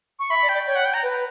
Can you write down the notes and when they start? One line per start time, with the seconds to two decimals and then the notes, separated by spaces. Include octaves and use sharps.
0.19 C#6
0.30 E5 B5
0.42 D5
0.49 G5
0.54 D5
0.67 C#5 G5
0.75 F#5
0.85 G5
0.94 A#5
1.03 B4